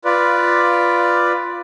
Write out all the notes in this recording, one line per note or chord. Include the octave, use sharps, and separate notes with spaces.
F4 B4 D5